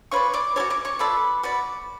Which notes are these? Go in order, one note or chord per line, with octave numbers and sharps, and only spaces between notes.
F4 B4 C#5 D5 C#6
D5 D6
F#4 A4 C#5 D5 D6
D5 D6
C#5 C#6
F4 A4 B4 D5 B5
F#4 B4 D5